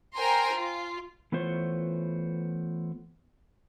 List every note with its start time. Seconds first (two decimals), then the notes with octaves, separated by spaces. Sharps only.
0.15 A#4 C5 G5 G#5 A#5 C6
0.54 F4
1.32 E3 A3 B3 F4 C5 C#5